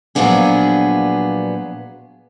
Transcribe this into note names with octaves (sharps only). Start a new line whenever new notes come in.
A#2 F3 F#3 B3 D4 G#4